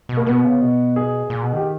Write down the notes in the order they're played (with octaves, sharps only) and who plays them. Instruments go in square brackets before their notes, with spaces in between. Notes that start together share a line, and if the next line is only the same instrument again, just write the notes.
[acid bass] B2
[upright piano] A#3
[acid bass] B2 [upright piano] B3
[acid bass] C#3
B2
[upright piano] G#4
[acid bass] A#2
B2
[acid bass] D#3 [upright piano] G4